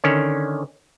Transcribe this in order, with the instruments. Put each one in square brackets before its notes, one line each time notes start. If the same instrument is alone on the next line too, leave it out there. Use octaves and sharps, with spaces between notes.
[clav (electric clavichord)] D3 D#3 C#4